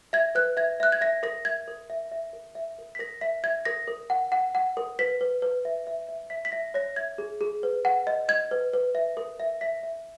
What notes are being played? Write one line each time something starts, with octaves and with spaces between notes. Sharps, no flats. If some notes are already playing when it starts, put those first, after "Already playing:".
E5 G#6
B4 F#6
E5 G#6
E5 F#6
G#6
E5 A#6
A#4 A#6
E5 G#6
A#4
E5
E5
A#4
E5
A#4
B6
A#4 A#6
E5 B6
E5 G#6
A#4 A#6
A#4
F#5
F#5
F#5
A#4
B4 B6
B4
B4
E5
E5
E5
E5 B6
B6
E5 A#6
C#5 A#6
E5 G#6
G#4
G#4
B4
F#5
D#5
D#5 G#6
B4
B4
E5
A#4
E5
E5 B6
E5